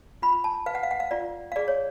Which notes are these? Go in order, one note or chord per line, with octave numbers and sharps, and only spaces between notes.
F4 B5
A5
B4 F5
F#5
F5
F#5
F5
F4 D5
F5
G#4 D5
C#5